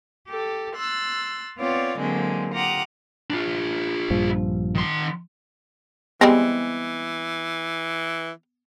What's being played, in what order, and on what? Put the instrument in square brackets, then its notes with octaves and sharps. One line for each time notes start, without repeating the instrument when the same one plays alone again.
[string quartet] G4 A4
C6 E6 F#6 A6
B3 C4 F4 C#5 D5
D3 F#3 G#3 A#3 C4
F4 G4 F#5 A#5 D6 D#6
[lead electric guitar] D4 F4
[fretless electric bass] A#1 G2 F3
[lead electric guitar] D#3 C6
[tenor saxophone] E3 [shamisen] G3 G#3 C4 [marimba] B3